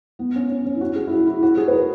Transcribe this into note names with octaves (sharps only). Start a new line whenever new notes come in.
B3
C#4
C#4
C#4
E4
F#4
G#4
E4
F#4
E4
F#4
G#4
B4
A#4